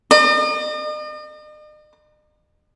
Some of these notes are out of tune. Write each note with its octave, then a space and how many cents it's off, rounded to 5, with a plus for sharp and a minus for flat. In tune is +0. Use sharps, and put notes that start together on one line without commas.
D#5 -45